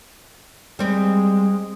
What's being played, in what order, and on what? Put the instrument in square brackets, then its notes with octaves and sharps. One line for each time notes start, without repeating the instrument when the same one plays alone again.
[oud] G3 C4 [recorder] G#3